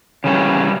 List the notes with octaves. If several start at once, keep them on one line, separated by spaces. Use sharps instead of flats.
C#3 E3 G3 C#4